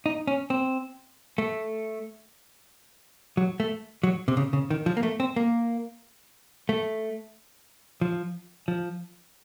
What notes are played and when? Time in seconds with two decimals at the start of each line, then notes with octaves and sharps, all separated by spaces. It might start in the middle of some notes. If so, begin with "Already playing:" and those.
0.06 D#4
0.27 C#4
0.50 C4
1.38 A3
3.37 F#3
3.60 A3
4.03 F#3
4.28 C3
4.37 C#3
4.53 C#3
4.70 D#3
4.86 F3
4.97 A#3
5.03 A3
5.20 C4
5.36 A#3
6.69 A3
8.01 F3
8.68 F3